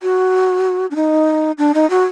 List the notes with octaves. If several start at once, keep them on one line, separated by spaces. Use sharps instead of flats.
F#4
D4
D#4
D4
D#4
F#4